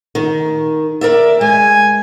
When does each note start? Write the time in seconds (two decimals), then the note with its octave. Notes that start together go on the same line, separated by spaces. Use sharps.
0.15 D#3
1.01 A#4 D5 E5
1.41 G#3 G#5